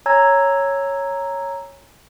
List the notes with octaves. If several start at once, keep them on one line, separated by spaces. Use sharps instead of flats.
C#5 G#5 A#5 E6 G#6